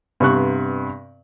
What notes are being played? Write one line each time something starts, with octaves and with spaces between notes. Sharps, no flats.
G2 C3 B3 C#6 F#6